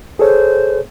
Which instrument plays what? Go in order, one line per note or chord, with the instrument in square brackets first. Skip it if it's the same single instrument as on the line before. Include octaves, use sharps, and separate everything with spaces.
[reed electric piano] G#4 A4 C#5 [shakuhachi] C5